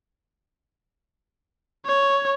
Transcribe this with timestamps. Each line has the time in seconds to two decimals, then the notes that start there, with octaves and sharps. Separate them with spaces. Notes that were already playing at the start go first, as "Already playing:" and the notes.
1.86 C#5